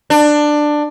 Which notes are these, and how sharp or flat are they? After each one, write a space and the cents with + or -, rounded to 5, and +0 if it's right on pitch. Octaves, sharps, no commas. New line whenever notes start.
D4 +15